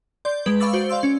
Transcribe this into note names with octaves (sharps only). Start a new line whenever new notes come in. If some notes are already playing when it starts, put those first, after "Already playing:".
D5 C6 G6
G#3 B4 D7
F5 B5 C#6 D6 E6 A6
F#4 C5 G6 D7
D5 F5 C6 E6
C#4